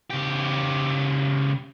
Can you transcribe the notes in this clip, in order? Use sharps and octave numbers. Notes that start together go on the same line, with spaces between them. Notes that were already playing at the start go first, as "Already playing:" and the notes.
C#2 G4